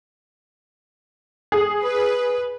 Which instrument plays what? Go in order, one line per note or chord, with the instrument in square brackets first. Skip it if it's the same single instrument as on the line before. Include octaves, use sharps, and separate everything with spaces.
[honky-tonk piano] G#4
[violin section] B4